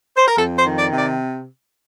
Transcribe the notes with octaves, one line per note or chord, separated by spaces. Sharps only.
C5
A#4
F2 A4
C5
D#3
D5
C3
D5